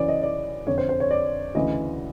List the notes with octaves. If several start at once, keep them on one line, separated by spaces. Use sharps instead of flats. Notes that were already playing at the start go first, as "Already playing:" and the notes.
Already playing: F#2 C#3 E3 C#5 D5
D#5
D5
F2 D3 C#5
C5
C5
C#5
D5
D2 C#3 E3 D#5